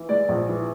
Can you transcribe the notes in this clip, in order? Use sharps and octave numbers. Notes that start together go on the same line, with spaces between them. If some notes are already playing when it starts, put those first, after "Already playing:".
Already playing: E3
G#3 D5
A#1
E3